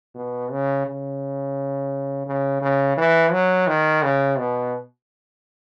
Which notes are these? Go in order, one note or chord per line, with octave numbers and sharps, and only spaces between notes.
B2
C#3
C#3
C#3
C#3
E3
F#3
D#3
C#3
B2